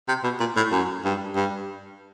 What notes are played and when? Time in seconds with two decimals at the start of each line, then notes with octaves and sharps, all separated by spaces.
0.08 C3
0.24 B2
0.40 A#2
0.57 A2
0.72 F#2
1.05 G2
1.36 G2